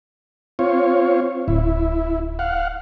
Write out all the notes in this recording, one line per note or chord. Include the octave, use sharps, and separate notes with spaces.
C4 F4 C#5
D1 E4
F5 F#5